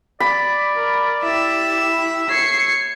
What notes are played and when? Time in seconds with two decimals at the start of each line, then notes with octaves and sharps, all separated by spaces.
0.20 D5 B5
0.76 A#4
1.23 E4 G4 E5
2.30 C#5 C7 C#7